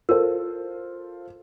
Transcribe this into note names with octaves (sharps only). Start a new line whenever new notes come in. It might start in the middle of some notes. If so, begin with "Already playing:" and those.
F4 A4 A#4 C5